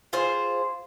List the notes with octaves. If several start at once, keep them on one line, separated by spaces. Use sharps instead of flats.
F4 G#4 C5